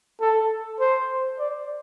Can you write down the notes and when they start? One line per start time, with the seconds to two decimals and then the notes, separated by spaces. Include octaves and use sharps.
0.21 A4
0.80 C5
1.39 D5